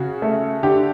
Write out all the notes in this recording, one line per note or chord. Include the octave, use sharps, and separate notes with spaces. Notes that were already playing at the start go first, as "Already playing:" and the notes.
Already playing: C#3 F#4
A3
D3 G4